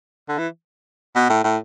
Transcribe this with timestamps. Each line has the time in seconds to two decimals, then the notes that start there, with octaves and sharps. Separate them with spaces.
0.29 D3
0.38 E3
1.16 B2
1.30 A2
1.44 A2